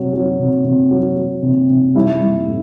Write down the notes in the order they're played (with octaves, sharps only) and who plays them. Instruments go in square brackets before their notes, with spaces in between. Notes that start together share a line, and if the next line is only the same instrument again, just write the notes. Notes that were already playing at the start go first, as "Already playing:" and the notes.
Already playing: [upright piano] C3 F#3
F#3
C3
C3
F#3
F#3
C3
C3
G3 E4
G3
A2